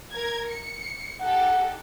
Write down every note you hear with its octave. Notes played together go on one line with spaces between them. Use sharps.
A#4 A#5 G#6
C#7
D#4 G4 A4 F#5